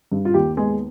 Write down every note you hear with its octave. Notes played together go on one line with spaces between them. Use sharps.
G2
F4
D#2 G4
G#3 B3 G#4